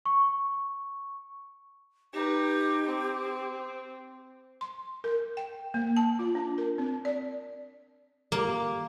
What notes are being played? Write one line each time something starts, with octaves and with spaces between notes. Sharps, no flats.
C#6
D#4 G4 B4
C4
C6
A#4
G5
A#3
A5
F4
D4
A#4
C4
D5
A#3